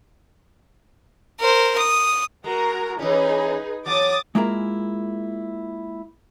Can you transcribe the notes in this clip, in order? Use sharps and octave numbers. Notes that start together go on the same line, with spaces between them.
A#4 C5
D#6
G#3 F#4 A#4 A#5
E3 C#4 D#4 G#4 B4
E2 F#3 D6 D#6 A6
G#3 A#3 E4 F4 G#4 A#4